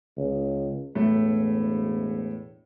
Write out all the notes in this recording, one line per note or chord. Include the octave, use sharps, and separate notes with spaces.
C#2
E1 A2 A3